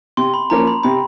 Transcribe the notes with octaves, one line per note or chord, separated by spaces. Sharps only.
C3 C6
B5
F3 A#3 C#4 A#5
B5
C3 B5